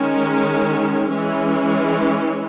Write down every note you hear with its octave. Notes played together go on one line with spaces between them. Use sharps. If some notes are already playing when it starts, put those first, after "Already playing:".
Already playing: D#3 G#3 C#4
E3 G#3 C#4